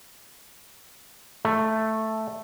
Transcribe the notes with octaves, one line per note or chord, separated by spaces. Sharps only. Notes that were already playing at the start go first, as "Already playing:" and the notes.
A3